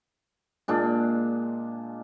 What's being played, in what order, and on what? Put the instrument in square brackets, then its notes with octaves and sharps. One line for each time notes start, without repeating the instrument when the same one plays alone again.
[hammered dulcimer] A#2 G#3 D4